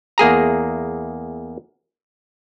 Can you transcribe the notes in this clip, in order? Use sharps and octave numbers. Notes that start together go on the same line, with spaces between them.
E2 A#3 G#4 A#5